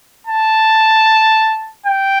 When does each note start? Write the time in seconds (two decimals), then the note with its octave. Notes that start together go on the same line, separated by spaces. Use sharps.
0.27 A5
1.86 G5